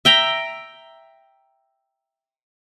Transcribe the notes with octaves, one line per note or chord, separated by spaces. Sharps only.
E5 G5 A#5